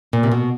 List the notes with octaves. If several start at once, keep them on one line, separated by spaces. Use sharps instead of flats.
A#2
C3
B2